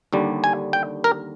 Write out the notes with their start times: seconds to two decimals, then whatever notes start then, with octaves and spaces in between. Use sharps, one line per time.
0.13 D#2 D3 G3
0.44 G#5
0.73 G5
1.04 A#4